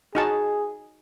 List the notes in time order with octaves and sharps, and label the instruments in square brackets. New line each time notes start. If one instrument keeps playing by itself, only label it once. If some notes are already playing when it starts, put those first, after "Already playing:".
[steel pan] D#4 F#4 A5 [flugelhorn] G#4